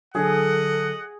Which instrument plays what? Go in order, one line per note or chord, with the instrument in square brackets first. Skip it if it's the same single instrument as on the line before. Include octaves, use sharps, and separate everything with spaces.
[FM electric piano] D3 F#3 [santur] G#4 [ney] A4 [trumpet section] D#5 F#5